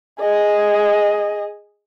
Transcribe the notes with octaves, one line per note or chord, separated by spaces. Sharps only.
G#4 D#5